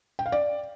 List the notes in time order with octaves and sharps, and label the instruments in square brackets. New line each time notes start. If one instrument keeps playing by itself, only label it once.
[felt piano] G5
F5
D5